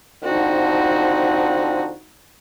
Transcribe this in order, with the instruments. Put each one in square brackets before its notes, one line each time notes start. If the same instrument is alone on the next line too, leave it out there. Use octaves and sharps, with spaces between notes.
[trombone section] D3 F3 C4 [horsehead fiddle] D#4 F#4